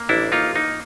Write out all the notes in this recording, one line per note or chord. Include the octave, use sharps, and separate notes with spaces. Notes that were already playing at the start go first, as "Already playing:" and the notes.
Already playing: A#3
A1 D4 E4
A#3 D#4 F4
A#3 D#4